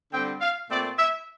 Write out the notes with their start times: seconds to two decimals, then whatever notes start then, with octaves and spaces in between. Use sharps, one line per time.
0.13 D3 G3 C4 G5
0.41 F5
0.70 A#2 A3 C4 D5
0.99 E5